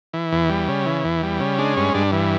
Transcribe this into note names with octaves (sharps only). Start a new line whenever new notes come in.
E3
E2
G3
C#3
E3
E2
G3
C#3
G#3 D4
G2 C#4
G2 D4
E3